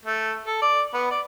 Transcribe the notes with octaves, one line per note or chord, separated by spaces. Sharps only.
A3
A4
D5
B3
D5